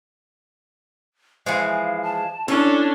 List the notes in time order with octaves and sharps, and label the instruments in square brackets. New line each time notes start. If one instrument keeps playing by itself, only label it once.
[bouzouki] E3 F3 G#3 [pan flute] F5
[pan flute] A5
[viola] C#4 D4 [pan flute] E4 [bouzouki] A4